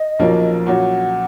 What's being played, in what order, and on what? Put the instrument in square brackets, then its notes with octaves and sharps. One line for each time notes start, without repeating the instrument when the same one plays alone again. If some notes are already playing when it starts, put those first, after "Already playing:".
Already playing: [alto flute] D#5
[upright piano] B1 A#2 F3 A#3 C#4
[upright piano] A#2 F#3 C#4 [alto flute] F#5